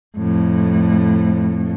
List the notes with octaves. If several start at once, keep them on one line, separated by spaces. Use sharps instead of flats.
F2 A2